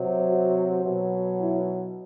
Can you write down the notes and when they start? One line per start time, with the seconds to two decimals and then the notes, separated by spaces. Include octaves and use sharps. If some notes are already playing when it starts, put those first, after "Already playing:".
Already playing: C3 F#3
0.29 F#4
0.84 B2 F#3
1.39 E4